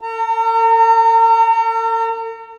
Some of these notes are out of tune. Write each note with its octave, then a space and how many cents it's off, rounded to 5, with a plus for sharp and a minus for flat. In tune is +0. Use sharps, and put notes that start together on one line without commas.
A4 +45 A#5 -35